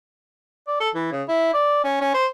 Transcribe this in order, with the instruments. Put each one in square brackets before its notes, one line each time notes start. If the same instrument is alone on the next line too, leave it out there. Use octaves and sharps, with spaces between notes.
[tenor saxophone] D5
A4
E3
C#3
E4
D5
C#4
C#4
C5